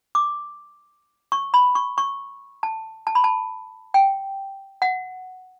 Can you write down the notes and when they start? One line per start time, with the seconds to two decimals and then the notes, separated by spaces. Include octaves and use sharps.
0.15 D6
1.32 C#6
1.54 B5
1.75 C#6
1.98 C#6
2.63 A5
3.07 A5
3.15 B5
3.24 A5
3.94 G5
4.82 F#5